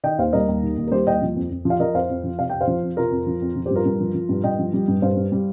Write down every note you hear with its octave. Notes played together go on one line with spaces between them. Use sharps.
D#3 D#5 G5
D#2 C5 F5
G3 A#4 D#5
D#2
D#3
D#2
A#4
G3 G4 C5
D#2 D#5 G5
F3
F2
F2
F3
F5
F3 A#4 D#5
F2 C5 F5
F2
F3
C3 F5
F2 G5
C5 F5
F3
F2
C3 F4 A#4
F2
F3
F2
F3
G2 G4 C5
F4 A#4
G2
F3
F3
G2
G2 D#5 G5
F3
G3
G2
G2 C5 F5
G3
G3